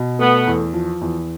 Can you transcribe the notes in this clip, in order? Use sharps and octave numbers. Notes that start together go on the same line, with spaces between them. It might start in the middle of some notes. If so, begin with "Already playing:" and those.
Already playing: B2
A3 B3
E2
F3
E2